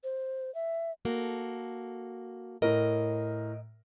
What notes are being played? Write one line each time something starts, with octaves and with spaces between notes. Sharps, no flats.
C5
E5
A#3 F#4 A4
A2 A#4 D#5